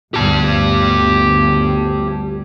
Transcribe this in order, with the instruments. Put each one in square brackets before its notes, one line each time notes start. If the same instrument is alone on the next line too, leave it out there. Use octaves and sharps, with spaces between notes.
[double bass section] G1 D2 G2 [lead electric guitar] G4 A5